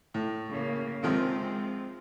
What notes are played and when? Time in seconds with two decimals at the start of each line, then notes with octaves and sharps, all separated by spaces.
0.14 A2
0.48 C#3 A#3
1.03 C3 D#3 F3 G#3 C4